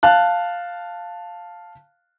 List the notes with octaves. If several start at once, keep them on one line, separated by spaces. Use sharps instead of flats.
F5 A5 F#6